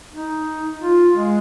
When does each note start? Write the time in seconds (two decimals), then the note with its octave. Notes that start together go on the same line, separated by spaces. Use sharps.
0.13 D#4
0.82 F4
1.14 G#3